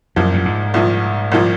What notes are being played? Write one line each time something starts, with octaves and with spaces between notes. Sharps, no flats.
C2 F#2 A#2 F3
G2
G#2
C2 A#2 F3
C2 A#2 F3